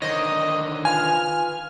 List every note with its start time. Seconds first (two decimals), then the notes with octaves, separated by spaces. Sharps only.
0.02 D3 D#3 D#4 C5 C#5 D#5
0.85 F4 B4 F5 G#5 F6